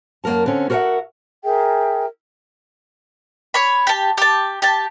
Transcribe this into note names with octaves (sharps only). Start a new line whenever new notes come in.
F#2 A#3 A4 A#4 A5
D3 C4 C#4
F#4 A#4 C5 D#5 E5 F#5
G#4 A#4 E5 G5
C#5 B5
G4 A5
G4 A5
G4 A5